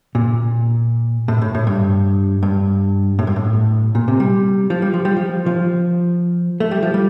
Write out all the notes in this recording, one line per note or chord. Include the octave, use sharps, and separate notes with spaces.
A#2
A2
A2
A2
G2
G2
A2
G2
A2
A#2
C3
G3
F3
G3
F3
G3
F3
F3
A3
G3
F3
G3